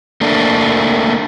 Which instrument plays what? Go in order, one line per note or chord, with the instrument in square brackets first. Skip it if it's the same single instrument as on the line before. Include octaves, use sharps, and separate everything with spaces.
[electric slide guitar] A3 A#3 D4